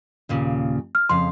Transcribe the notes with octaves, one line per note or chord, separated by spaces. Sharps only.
D#2 A#2 C#3
F6
F2 C#3 F5 C6